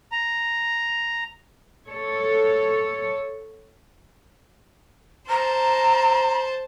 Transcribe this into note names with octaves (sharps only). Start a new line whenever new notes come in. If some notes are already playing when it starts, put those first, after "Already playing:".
A#5
A4 C#5
C5 A5 A#5